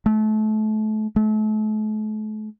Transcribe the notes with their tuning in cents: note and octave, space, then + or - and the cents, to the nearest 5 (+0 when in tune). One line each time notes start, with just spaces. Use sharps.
A3 -30
A3 -40